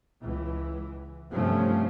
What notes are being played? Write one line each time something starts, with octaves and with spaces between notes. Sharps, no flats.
C#2 E3
G2 C3 F3 A3 C#4